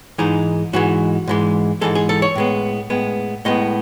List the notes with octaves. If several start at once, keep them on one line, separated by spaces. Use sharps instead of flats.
G#2 E3 G#3 D#4
G#2 E3 G#3 F#4
G#2 E3 G#3
G#2 E3 G#3 A4
G#4
A4
C#5
A2 G#3 B3
A2 G#3 B3
A2 G#3 B3 D#5